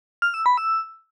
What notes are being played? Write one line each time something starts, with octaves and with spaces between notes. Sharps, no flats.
F6
E6
B5
E6